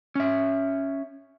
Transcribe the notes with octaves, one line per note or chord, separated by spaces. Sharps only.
C#4 E5